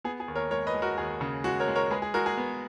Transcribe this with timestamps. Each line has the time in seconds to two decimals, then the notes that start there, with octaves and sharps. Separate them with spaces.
0.04 B3 G#4
0.20 G#4
0.28 D#2
0.36 A#4 C#5
0.51 G#3 A#4 C#5
0.67 B4 D#5
0.74 G#3
0.82 F#4 A#4
0.98 D#2 G#4
1.21 C#3
1.44 G#3 F#4
1.60 A#4 C#5
1.68 G#3
1.75 A#4 C#5
1.91 G#3 G#4 B4
2.02 G#4
2.14 G#3 F#4 A#4
2.26 G#4
2.38 B3